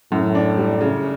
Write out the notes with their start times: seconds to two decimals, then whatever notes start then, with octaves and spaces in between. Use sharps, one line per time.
0.12 F#2 A2
0.35 D4
0.58 G3
0.81 C#3